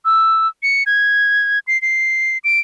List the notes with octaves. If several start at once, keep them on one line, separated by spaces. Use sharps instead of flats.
E6
C#7
G#6
C7
C7
D7